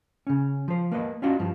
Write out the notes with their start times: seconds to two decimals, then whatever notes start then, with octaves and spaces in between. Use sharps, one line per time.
0.27 C#3 C#4
0.68 F3 C5
0.91 A#3 B4 D#5
1.22 C#4 D4 F4 F#4 D#5
1.39 G2 F3